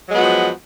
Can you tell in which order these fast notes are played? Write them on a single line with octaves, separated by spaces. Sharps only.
F#3 G#3 B3 F#4 F3